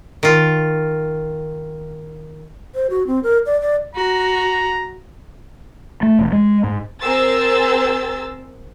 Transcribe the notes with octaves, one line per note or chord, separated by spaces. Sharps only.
D#3 F4
C5
F#4
C4
A#4
D5
D5
F#4 A#5
A3
E1
G#3
G#2
C4 G#4 A#4 C5 E6 A6